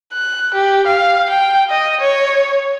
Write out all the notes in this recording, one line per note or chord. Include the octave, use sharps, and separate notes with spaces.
F#6
G4
F5
G5
D#5
C#5